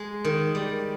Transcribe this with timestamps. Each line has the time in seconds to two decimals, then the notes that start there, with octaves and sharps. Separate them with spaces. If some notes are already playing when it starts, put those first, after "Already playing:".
Already playing: G#3
0.24 D#3
0.55 G3